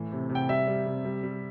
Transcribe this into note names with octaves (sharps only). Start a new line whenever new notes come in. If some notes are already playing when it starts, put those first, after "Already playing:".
Already playing: A2 E3
C3
C3
G5
G3 E5
G3
C3
G3
G3